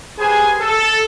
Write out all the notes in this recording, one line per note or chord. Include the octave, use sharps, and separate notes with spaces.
G4 G#4 B4 C5 G#5
A4